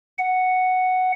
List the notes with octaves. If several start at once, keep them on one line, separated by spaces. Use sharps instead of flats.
F#5